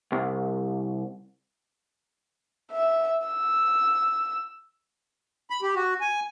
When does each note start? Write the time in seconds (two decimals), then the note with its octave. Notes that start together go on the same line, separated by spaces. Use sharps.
0.12 C2
2.71 E5
3.27 E6
5.50 B5
5.62 G4
5.76 F#4
6.01 G#5